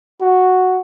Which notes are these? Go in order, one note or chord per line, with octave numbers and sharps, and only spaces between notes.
F#4